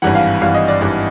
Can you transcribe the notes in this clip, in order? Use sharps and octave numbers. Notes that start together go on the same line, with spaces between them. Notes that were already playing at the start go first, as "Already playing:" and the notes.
G#1 G2 E3 F#5
F5
G#1 G2 E3 F5
D#5
D5
G#1 G2 E3 D5